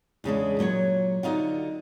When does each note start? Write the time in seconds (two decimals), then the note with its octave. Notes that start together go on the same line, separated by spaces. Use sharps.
0.24 E2 C#3 G#3 D4
0.59 A#2 F#3 C5 C#5
1.23 D3 D#4 F4 F#4